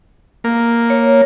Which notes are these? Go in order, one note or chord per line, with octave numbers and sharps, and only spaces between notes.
A#3
C#5